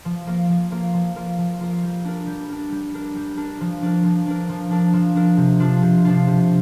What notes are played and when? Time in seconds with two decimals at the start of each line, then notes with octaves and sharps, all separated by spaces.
0.05 F3
0.27 A#3 F4 A#4
0.49 F3
0.71 A#3 F4 A#4
0.94 F3
1.16 A#3 F4 A#4
1.38 F3
1.60 A#3 F4 A#4
1.83 G3
2.05 D4 A#4
2.26 G3
2.49 D4 A#4
2.72 G3
2.94 D4 A#4
3.16 G3
3.37 D4 A#4
3.61 F3
3.82 D4 A#4
4.04 F3
4.27 D4 A#4
4.49 F3
4.71 D4 A#4
4.93 F3
5.16 D4 A#4
5.37 C3
5.60 F3 D4 F4
5.82 C3
6.05 F3 D4 F4
6.27 C3